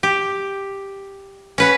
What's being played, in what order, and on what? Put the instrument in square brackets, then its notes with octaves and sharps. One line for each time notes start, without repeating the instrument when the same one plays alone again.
[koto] G4
C#4 B4 F#5